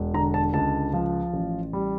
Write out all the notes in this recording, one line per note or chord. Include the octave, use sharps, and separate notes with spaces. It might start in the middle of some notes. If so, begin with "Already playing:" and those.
Already playing: E1
D3 A#5
A5
C#2 A5
F3
A1
G3